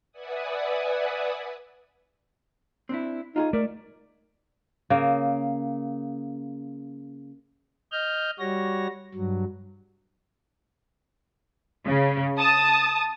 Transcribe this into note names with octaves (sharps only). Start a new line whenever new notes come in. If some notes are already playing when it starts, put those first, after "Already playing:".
B4 D5 E5 F#5 G#5 D#6
C4 D4 E4
D#4 F4 F#4 G#4
A3 A#4 D5
C#3 A#3
D#5 F6 G6
G3 F#4 C#5 A#6
G2 F#3
C#3
A5 D#6